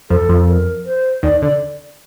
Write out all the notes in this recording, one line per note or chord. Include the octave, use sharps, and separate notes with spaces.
F2 F3 A4
F2 F3
A#4
C5
D#2 D#3 D5
D3 D5